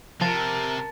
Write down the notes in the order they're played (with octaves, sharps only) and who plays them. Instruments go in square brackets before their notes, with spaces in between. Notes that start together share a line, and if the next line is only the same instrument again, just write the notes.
[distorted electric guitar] C3 [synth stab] F3 [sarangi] A#4 [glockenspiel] A5 A6